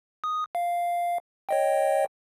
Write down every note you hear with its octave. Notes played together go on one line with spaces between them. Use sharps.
D#6
F5
C#5 D#5 G5